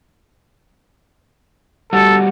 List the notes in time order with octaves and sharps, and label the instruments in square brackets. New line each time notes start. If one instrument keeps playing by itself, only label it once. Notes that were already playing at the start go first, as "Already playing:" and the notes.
[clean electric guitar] G3 B3 F#4 [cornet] A4